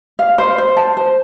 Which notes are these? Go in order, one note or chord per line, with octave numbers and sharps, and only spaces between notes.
F5
C5
C5
A5
C5